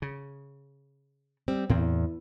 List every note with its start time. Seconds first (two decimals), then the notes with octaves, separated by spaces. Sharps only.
0.02 C#3
1.48 G3 C4
1.70 E2 A2 C4